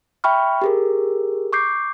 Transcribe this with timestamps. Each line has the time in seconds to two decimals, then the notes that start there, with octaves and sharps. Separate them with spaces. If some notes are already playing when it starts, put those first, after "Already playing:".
0.24 E5 G5 B5 C#6 F6
0.62 G4 G#4 A#4
1.53 C#6 D6 G6 C7